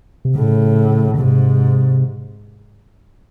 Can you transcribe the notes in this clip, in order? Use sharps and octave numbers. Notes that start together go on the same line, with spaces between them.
C3
A2 C#3
C#3
G#2 C3